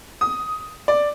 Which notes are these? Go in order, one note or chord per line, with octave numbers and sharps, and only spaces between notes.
D#6
D5